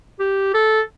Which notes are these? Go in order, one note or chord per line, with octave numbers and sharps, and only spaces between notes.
G4
A4